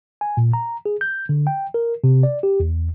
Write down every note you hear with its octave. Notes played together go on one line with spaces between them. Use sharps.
G#5
A#2
A#5
G#4
G6
D3
G5
A#4
C3
D5
G4
E2